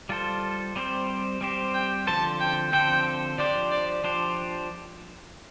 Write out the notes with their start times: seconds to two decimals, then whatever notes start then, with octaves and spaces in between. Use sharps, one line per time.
0.09 G3 F4 A4 C5
0.76 G3 C4 G4 C5
1.41 G3 C4 G4 C5
1.74 G5
2.07 D3 F3 C4 A4 C5 A5
2.40 G5
2.72 D3 F3 C4 A4 C5 G5
3.38 F3 D4 G4 C5 D5
3.71 D5
4.04 F3 D4 G4 C5